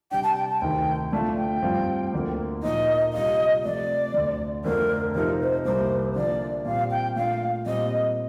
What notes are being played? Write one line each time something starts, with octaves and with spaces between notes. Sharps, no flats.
C3 G3 D4 G5
A5
G5
A5
D2 C3 D#3 G5
D3 A3 D4 F4 A5
G5
G2 F3 C4 F4
D2 D3 F3 A#3
A#2 F3 A#3 D#4 D#5
C3 G3 D4 F4 D#5
C3 F3 A3 C4 F4 D5
D2 D3 A3
F2 D3 F3 A3 D4 A#4
C3 F3 C4 D#4 A#4
C5
C2 C3 G3 A#3 C5
D3 F3 A#3 D5
A#2 G3 C4 F5
G5
A#2 A3 D4 F4 F5
A#2 G3 C4 D#5